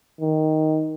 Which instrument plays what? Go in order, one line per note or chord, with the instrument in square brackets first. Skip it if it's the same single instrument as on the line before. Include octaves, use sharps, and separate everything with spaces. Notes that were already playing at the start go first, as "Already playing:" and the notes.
[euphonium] D#3